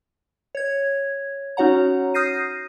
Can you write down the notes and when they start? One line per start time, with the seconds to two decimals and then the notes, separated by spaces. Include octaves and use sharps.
0.55 C#5 G#6
1.57 C#4 D#4 F#4 C#5 F#5 A#5
2.14 D#6 F6 G6 A#6 C7 D#7